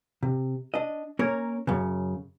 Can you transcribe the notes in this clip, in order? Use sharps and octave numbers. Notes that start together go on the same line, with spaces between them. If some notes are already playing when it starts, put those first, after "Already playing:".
C3
D4 D#5
A#3 C#4 A#4 C#5
F#2 C#3